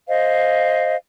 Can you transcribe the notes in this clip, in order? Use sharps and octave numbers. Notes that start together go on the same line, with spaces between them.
C5 D#5 F5